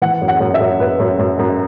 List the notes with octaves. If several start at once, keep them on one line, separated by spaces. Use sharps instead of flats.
E3 F#5
F#2
F#5
F#2
E5
F#2
F#2 B4
F#2
F#2
F#2